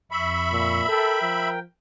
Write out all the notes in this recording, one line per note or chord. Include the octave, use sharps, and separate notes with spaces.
F2 E5 B5 C#6
A#2
A4 A#4 G5
F3